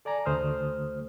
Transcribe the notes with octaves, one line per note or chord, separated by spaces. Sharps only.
A4 D5 G#5 A#5
D2 A3 C5 D#6 F6